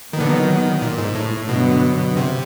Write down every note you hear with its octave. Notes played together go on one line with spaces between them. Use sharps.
A#2 D#3 F#3 B3
D3
D#3
A#2
G#2
A2
G2 B2 D3 F#3 B3
C3